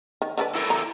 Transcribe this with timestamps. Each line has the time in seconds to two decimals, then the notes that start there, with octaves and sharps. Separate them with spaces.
0.22 D#3
0.38 D3 D4 B4
0.55 E4 A4 A#4
0.70 A#5